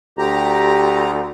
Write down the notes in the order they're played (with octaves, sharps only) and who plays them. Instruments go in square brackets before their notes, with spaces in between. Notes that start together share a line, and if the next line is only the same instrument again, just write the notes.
[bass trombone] D2 [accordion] G4 A#5